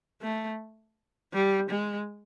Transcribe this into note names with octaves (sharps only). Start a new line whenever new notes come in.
A3
G3
G#3